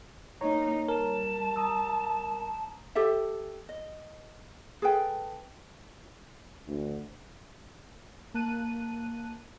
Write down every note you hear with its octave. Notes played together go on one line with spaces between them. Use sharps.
A#3 D#4 C#5 A#5
G3 A#4 A5
A#5 D#6 E6
G4 A4 E5
D#5
G#4 A4 B4 G5
D2
A#3 A5 F#6 D#7